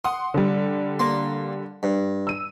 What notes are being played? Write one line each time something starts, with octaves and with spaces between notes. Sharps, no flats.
F#5 C6 D#6
D3 G3
A#3 C6
G2
E6 D#7